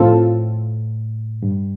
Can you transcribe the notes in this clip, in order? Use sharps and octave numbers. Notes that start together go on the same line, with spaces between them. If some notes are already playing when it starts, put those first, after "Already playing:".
Already playing: A2 F3 C4 F4 A4
G2